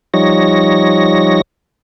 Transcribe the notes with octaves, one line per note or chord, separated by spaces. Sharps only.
F3 G3 D#4 C#5 A#6